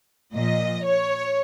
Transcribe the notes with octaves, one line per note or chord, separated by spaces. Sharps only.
A#2 F3 D#5
C#5